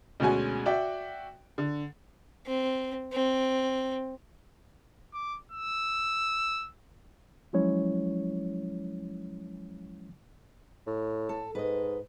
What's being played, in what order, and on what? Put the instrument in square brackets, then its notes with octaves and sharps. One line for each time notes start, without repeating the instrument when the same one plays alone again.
[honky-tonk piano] D2 B2 G#3 C#4 F#4 G#5
F#4 D5 E5 G5
D3
[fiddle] C4
C4
[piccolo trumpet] D6
E6
[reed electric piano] F3 F#3 G#3 C#4 E4 C#5
[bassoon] A2
[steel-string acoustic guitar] A4
[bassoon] G#2 [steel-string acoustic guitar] B4 D#5